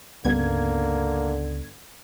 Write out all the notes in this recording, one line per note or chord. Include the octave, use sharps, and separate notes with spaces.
C#2 G2 D3 A#3 B3 C#4 G#6